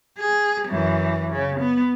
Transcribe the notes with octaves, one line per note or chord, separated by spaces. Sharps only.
G#4
F#2 E3
C#3
B3